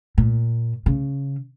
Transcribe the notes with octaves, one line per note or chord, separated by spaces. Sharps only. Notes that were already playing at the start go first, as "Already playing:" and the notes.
A#2
C#3